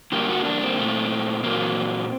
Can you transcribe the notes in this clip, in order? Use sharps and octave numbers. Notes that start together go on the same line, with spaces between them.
G2 D3 G3 A#3 G4
F#4
D4
C4
A#2 A3
A#2 F#3 A#3